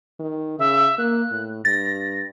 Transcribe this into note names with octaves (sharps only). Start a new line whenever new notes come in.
D#3
C#3 E5
A#3 F#6
A2
G2 A6 A#6